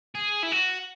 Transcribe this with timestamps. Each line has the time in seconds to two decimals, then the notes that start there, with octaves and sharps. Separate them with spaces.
0.15 G#4
0.43 E4
0.52 F#4